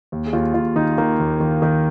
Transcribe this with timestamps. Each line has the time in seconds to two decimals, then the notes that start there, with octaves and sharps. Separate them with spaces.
0.12 D#2
0.26 G#4
0.33 D#2 F4
0.54 D#2 F4
0.76 D#3 D#4
0.98 D#3 A#3
1.20 D#2
1.40 D#3
1.62 D#3